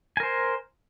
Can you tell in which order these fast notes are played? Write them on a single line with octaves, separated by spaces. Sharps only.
G#5 A#4 C5